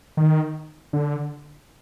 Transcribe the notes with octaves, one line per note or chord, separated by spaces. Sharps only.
D#3
D3